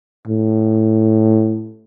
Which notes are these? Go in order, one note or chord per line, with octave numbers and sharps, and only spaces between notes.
A2